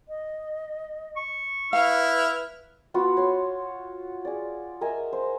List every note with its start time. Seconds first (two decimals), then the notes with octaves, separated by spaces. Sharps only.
0.08 D#5
1.17 C#6
1.73 E4 B4 F5 F6
2.94 B3 F4 F#4
3.17 C#5 C6
4.25 G#4 D5
4.81 A#4 D#5 E5 G#5
5.13 C5